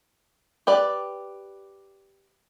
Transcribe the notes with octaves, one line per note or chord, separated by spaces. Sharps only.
G4 B4 D5